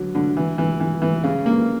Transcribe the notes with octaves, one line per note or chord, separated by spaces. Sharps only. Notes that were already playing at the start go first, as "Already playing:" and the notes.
Already playing: D3 F#3
D3
E3
E3
E3
E3
C#3
A#3